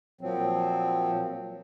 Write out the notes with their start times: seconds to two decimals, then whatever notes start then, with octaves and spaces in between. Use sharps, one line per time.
0.21 A#2 F3 F#3 C4